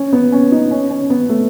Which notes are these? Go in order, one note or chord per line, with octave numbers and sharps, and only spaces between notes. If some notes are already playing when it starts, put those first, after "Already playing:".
Already playing: C#4
B3
C#4
D#4
C#4
C#4
B3
A3